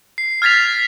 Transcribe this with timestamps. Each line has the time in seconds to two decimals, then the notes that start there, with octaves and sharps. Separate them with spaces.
0.18 C7
0.42 F6 G#6 A6 B6 F7